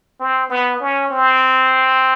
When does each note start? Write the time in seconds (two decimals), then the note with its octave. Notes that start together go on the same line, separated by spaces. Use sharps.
0.20 C4
0.50 B3
0.80 C#4
1.10 C4